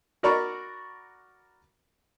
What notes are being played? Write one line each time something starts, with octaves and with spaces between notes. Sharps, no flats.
F#4 A#4 D5 A#5 B5 C#6